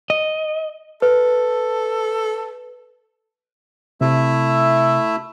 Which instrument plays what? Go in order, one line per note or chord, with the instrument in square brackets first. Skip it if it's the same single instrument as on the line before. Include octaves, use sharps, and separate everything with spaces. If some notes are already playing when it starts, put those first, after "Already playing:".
[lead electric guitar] D#5
[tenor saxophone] A4 [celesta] B4
[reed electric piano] C3 [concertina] A3 E4 E5